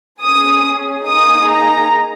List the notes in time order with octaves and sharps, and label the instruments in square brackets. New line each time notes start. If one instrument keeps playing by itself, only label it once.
[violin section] C#4 G#4 D#6
A#3 D#4 G#4 D#6
A#5